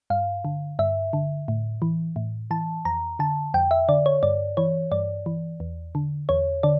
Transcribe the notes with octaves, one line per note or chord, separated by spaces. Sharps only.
G2 F5
D3
G2 E5
D3
A2
E3
A2
E3 A5
F2 A#5
D3 A5
F2 G5
E5
D3 D5
C#5
G2 D5
E3 C#5
G2 D5
E3
E2
D3
E2 C#5
D3 D5